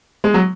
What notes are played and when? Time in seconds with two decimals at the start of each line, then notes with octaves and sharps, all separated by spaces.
0.24 G#3
0.34 F#3